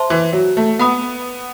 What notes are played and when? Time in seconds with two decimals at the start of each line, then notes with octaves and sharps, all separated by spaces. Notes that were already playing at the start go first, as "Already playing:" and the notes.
Already playing: C5 E5 A5 C6
0.10 E3
0.33 F#3
0.57 A3
0.79 B3 F#5 B5 D#6